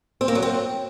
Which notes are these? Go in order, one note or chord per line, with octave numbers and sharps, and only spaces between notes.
C4
A#3
F#3
C4